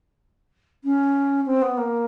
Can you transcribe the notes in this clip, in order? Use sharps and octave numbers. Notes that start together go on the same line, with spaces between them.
C#4
C4
B3
A#3